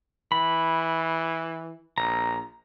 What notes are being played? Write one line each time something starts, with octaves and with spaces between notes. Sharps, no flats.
E3 B5
A#1 A#5